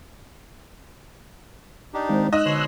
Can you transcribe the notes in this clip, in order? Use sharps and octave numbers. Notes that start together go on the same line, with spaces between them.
D4 D#4 G4
D#3 G#3 C4
D#4 D#5 E6 F#6
B2 D3 C#5 C6